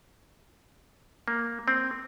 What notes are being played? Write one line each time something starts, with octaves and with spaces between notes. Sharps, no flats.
A#3
C4